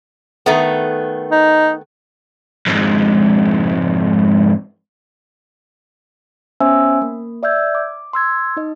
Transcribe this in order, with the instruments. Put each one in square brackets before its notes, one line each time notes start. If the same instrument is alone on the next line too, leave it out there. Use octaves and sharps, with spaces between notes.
[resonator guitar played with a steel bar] D#3 A3 B3
[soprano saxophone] D#4
[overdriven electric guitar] F2 G#2
[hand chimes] B3 C#4 C5 E5 G#5 E6
A#3
D5 E5 E6 G6 G#6
D6
C6 E6 G#6
D#4 D#5